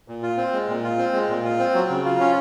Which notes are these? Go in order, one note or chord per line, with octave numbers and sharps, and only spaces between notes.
A#2
F4
C4
G#3
A#2
F4
C4
G#3
A#2
F4
C4
F#3
C#3
F4
C#4